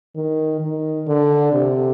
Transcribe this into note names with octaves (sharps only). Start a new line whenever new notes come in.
D#3
D#3
D3
C3